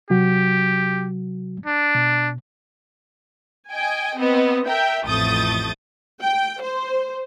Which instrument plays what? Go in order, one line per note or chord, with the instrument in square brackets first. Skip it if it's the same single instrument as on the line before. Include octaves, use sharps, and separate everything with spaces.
[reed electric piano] C3 F#3 F#4 [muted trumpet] G4
[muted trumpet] D4
[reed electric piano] B2
[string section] D#5 G5 G#5
B3 C4 D#5
A#4 E5 G5
A1 F2 A3 D#6 G6 A6
[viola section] G5
C5